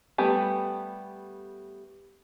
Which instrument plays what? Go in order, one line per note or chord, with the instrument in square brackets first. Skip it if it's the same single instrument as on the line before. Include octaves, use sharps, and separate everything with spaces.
[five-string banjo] G3 A3 B3 G4 G#5